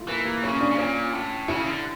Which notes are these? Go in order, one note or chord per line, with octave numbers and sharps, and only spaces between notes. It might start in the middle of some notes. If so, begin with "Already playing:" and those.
Already playing: A3 E4 F4
E3 A#3
A#3
C#3 C#4
D4
C#3
A#2 C#4
A2
C#3 E4
D3